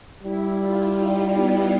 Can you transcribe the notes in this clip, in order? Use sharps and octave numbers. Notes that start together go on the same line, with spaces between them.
G3 E4
F4
D#4
B3